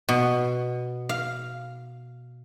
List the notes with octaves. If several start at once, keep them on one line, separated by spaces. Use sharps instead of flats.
B2
F5